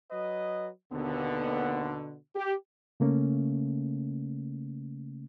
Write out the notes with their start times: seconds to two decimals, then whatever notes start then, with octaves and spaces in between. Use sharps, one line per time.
0.11 F#3 B4 D#5
0.92 D#2 B2 D3 B3
2.35 G4
3.00 C#3 A3 A#3 C#4